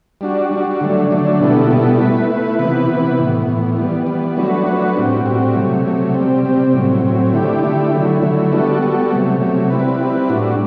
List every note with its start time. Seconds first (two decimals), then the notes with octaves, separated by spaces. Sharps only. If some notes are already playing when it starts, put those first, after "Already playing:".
0.21 G3 D4 F#4
0.51 G3 D4 F#4
0.81 D3 F#3 A3 D4
1.11 D3 F#3 A3 D4
1.40 B2 G3 B3 E4 A4
1.70 B2 G3 B3 E4 A4
1.99 A3 E4 B4
2.30 A3 E4 B4
2.59 C3 E3 B3 E4 B4
2.88 C3 E3 B3 E4 B4
3.17 A2 E3 B3
3.47 A2 E3 B3
3.77 E3 G3 B3
4.07 E3 G3 B3
4.37 F#3 A3 D4 F#4 B4
4.66 F#3 A3 D4 F#4 B4
4.96 A2 G3 C4 F#4
5.25 A2 G3 C4 F#4
5.55 C3 F#3 A3
5.85 C3 F#3 A3
6.14 C3 G3 C4
6.44 C3 G3 C4
6.73 A2 F#3 C4
7.04 A2 F#3 C4
7.33 D3 A3 E4 G4
7.63 D3 A3 E4 G4
7.92 D3 F#3 A3 E4
8.22 D3 F#3 A3 E4
8.52 G3 B3 F#4 A4
8.81 G3 B3 F#4 A4
9.11 C3 F#3 A3
9.40 C3 F#3 A3
9.70 G3 C4 E4 B4
10.01 G3 C4 E4 B4
10.29 A2 G3 D4 F#4